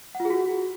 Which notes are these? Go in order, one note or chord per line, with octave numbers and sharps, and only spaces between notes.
F#5
F4
G#4
F#4